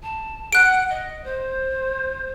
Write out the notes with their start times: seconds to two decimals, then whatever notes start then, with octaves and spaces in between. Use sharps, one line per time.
0.03 A5
0.53 F#5 F#6 D7
0.90 D#5
1.24 C5